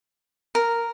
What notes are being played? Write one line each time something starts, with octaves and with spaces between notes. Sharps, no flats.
A#4